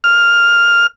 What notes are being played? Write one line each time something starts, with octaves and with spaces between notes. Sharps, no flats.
F6